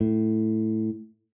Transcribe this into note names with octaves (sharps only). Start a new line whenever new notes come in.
A2